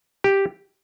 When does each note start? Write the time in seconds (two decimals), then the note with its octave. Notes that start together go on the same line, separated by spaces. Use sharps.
0.24 G4